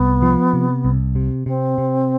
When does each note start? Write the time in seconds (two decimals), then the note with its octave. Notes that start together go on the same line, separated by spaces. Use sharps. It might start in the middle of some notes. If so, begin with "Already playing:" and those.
Already playing: C2 B3
0.22 F3
0.53 C3
0.85 C2
1.15 C3
1.46 C3 C4
1.78 C3